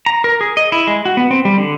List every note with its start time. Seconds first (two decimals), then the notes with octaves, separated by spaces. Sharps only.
0.06 A#5
0.24 A#4
0.41 G#4
0.57 D#5
0.72 E4
0.87 G#3
1.06 F#4
1.17 B3
1.31 C4
1.45 G3
1.58 D3